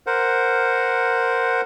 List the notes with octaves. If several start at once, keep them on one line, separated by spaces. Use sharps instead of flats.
A#4 C5 F#5